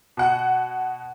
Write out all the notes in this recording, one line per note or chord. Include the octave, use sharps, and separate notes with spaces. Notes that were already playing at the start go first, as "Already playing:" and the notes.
B2 F#5